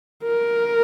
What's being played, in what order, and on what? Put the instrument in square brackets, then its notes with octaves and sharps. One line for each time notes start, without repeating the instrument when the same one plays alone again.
[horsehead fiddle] A#4